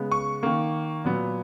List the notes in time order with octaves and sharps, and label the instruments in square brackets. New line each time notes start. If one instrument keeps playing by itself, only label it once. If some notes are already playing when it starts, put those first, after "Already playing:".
Already playing: [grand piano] C#3 G#3 B3
C#6
D#3 A#3
A#2 F#3 B3